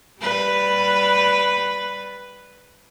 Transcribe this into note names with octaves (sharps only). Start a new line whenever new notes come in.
G3 B4